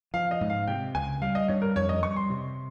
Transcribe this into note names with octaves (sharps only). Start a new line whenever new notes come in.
F3 F5
D#5
G#2
F5
C3 G5
C#2 G#5
G3 F5
D#5
G2 C#5
A#4
F2 C#5
D#5
G3 C#6
C6
C3